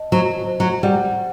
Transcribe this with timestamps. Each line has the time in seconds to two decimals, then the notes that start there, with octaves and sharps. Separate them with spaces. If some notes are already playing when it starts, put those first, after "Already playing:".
Already playing: D#5 A5
0.12 F#3 C5
0.47 C5
0.60 F#3
0.83 G3 F#5